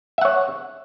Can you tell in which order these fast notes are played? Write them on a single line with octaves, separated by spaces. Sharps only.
E5 F#5 C#5